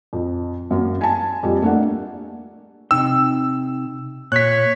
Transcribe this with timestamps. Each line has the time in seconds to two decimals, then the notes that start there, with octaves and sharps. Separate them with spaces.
0.13 F2
0.71 F#2 A#3
1.01 G#5 A5
1.43 F2 G3
1.62 A3 A#3 D4 A4 F#5
2.91 C3 D#4 G5 E6
4.32 A#2 C#5 F#6 B6